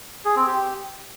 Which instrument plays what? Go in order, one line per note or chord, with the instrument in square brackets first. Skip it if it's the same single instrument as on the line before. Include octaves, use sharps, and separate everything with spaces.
[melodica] G#4
C4
G4